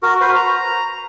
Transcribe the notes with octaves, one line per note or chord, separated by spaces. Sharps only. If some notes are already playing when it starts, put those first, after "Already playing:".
F#4 A#4
F#4 B4 C5
A#5